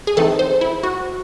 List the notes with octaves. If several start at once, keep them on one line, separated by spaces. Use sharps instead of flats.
G#4
E3 A3 C4 D#4 A4
C5
E4
F#4